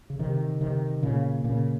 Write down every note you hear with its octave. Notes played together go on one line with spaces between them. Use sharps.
C#3
C3 D#3
C3 D#3
A#2 C#3
A#2 C#3